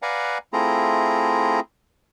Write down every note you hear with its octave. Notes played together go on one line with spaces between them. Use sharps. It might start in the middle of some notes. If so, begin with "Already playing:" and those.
B4 D5 F5 F#5 G#5 A#5
A3 C4 E4 F4 G#4 A#5